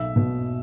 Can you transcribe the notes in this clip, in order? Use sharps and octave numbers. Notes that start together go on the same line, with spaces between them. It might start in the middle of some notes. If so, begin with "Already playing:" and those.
Already playing: B1 E5
B2